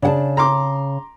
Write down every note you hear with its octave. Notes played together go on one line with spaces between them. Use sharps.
C#3 D4 F#5 A5
A#5 C6 D6